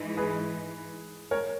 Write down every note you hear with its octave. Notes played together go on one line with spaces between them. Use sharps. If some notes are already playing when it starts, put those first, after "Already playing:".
Already playing: G#2 E3 G#3 D#4
G#4 B4
A#4 C#5